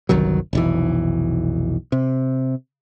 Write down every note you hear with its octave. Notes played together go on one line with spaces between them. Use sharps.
G1 C2 D#3 F#3
F1 B1 E3
C3